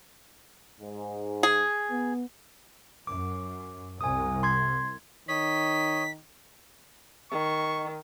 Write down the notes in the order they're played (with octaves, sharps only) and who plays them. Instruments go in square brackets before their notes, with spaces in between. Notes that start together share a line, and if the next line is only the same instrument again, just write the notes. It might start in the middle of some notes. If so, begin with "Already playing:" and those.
[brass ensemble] G#2
[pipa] G#4
[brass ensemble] B3
[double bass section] F#2 [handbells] D6
[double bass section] C2 [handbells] G#5 D#6
[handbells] C6 G#6
[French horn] D#3 [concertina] C#5 D#5 [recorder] B6
[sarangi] D#3 [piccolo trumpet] C#6